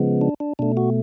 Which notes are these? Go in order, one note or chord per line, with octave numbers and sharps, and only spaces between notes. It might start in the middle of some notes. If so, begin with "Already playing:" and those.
Already playing: C#3 F3 G#3 B3
D4
D4
B2 A3 D4
F#4